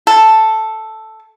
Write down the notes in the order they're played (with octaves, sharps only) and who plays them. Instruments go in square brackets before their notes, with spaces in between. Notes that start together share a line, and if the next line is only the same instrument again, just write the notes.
[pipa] A4